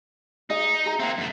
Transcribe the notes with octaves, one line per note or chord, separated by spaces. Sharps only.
D#4 G#4 D#5
G#4 A#5
A#3 C4 E5 F#5
F#2 A3